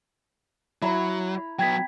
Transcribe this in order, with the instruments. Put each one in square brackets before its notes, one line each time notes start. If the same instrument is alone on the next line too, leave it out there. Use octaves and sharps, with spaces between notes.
[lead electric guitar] F#3 [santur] E4 A#5
[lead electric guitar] F#3 B3 [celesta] G5 G#6 B6